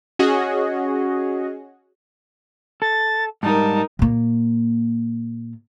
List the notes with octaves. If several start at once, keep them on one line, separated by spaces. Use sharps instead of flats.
C#4 F#4 G#4 C#5 D#5
A4 A6
G#2 G3 D#4 A#4 A5
A#2 A#3